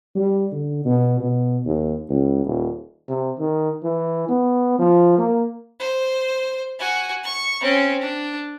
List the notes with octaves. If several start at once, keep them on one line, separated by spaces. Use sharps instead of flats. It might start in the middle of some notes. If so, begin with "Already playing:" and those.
G3
D3
B2
B2
D#2
C#2
D#1
C3
D#3
E3
B3
F3
A#3
C5
F#4 G#5
C#6
C4 C#4
D4